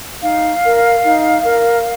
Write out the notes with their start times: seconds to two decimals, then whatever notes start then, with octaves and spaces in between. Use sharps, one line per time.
0.21 D#4 F5
0.62 A#4
1.03 D#4
1.44 A#4